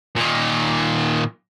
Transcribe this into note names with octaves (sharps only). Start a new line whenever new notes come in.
A#2 D#3